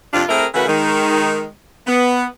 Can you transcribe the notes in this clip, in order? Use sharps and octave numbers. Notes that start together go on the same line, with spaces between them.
F2 C3 D4 F4
A3 C4 E4 G#4 A#4
C#3 E3 A3 F#4 A#4 B4
D#3 G#3
B3